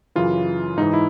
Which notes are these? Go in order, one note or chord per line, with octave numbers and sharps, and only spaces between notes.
F#2 C#3 E3 F4
G#2 E3 D#4
E4